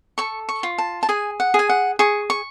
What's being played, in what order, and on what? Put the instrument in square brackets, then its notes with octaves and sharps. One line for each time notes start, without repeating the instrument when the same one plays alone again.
[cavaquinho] A4 C#6
C#6
F4
A5
A5
G#4 G#5
F#5
G#4
G#5
F#5
G#4 C#6
C#6